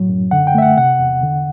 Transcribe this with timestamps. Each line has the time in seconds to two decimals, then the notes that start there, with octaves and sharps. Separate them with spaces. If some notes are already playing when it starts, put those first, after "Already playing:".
Already playing: A2 F#3
0.09 F#2
0.31 D3 F#5
0.47 G5
0.55 A3 E5
0.62 F#5
0.77 C3 F#5
0.99 E2
1.23 D3